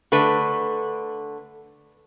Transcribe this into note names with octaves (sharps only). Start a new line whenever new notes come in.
D3 A3 B4